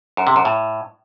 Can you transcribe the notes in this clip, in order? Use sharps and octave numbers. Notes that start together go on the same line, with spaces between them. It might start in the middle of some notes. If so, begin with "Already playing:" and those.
F#2
C3
F#2
A2